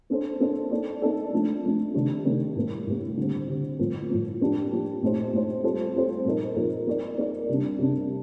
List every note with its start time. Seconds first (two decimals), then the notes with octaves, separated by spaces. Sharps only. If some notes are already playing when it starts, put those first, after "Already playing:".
0.10 A#3 D4 A4 C5
0.40 A#3 D4 A4 C5
0.71 A#3 D#4 A4 D5
1.02 A#3 D#4 A4 D5
1.33 F3 A3 D4
1.64 F3 A3 D4
1.94 C3 D#3 A3 D4
2.25 C3 D#3 A3 D4
2.56 A2 G3 A#3
2.87 A2 G3 A#3
3.17 D3 G3 C4
3.48 D3 G3 C4
3.79 A2 F3 A#3
4.10 A2 F3 A#3
4.41 F3 A#3 D4 G4
4.71 F3 A#3 D4 G4
5.02 A#2 A3 D#4 G4 C5
5.33 A#2 A3 D#4 G4 C5
5.64 G3 C4 F4 A4 C5
5.95 G3 C4 F4 A4 C5
6.25 A#2 F3 A#3 D#4 A#4
6.56 A#2 F3 A#3 D#4 A#4
6.87 A#3 D#4 A#4 D5
7.18 A#3 D#4 A#4 D5
7.49 C3 G3 D4
7.79 C3 G3 D4